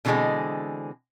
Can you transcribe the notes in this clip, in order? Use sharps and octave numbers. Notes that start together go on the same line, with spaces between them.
B2 D3 E3 G3 G#3 C4